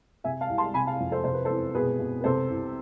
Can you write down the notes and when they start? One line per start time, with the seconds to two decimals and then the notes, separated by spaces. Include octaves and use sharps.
0.24 C3 E5 G#5
0.41 F5 A5
0.49 C2
0.58 A5 C6
0.74 C3 G#5 B5
0.86 F5 A5
1.00 F2
1.11 A4 C5
1.24 C3 C5
1.34 B4
1.45 A4 C5
1.50 E2
1.74 B2 G#4 B4
1.99 B2
2.21 B4
2.24 C3 A4 C5
2.50 C2